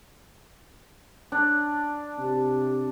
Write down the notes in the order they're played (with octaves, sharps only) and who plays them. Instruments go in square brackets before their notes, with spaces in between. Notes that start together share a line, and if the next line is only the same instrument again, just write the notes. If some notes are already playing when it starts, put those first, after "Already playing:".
[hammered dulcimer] D4
[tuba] C3